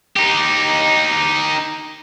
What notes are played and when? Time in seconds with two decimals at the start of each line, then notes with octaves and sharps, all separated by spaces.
0.16 D#4 G4